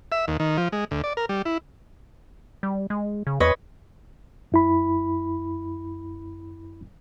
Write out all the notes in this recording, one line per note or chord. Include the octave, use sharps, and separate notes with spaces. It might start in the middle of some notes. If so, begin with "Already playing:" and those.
E5
D#2
D#3
F3
G#3
D2
D5
A#4
G3
E4
G3
G#3
C#3
E2 B4 C#5 D#5
F#2 E4 B5